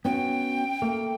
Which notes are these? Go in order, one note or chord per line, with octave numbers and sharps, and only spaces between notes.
B3 C#4 F#4 G5
A3 A#3